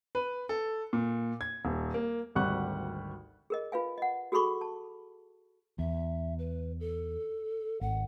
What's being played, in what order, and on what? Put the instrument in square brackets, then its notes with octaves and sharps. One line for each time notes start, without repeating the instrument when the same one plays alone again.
[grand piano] B4
A4
A#2
G#6
D#1
A#3
G#1 D2 G3 F#5 C#6 F#6
[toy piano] G#4 A#4 D#5
F4 B4 F5 G#5
D#5 F#5
F#4 G#4 A4 B5 C#6 D6
A5
[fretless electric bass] E2 [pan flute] E5
[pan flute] B4
A4
[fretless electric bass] G#1 [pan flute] F#5